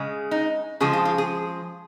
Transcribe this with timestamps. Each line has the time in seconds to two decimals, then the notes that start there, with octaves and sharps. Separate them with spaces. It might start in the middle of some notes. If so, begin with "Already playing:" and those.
Already playing: C#3 G#3
0.31 D#4
0.80 C#3 F3 G#3 G#4
0.93 F4
1.05 F4
1.18 G#4